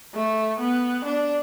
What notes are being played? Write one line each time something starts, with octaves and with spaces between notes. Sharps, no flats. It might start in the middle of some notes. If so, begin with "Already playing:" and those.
A3
B3
D4